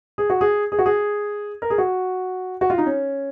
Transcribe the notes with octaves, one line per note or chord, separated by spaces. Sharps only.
G#4
F#4
G#4
G#4
F#4
G#4
A#4
G#4
F#4
F#4
F4
D#4
C#4